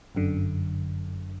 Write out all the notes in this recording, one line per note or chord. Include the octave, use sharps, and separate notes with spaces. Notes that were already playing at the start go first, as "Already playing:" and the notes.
G1 F#2 D3